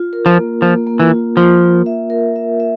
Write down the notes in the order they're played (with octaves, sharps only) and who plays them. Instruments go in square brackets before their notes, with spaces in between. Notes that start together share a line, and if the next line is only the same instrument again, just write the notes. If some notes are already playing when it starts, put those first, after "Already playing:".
Already playing: [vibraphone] F4
A#4
[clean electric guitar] F3
[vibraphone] A#3
[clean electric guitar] F3 [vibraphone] A#3
[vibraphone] A#3
[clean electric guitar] E3
[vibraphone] F4
[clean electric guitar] F3 [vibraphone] F4
[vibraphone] A#3
E5
A#4
E5
E5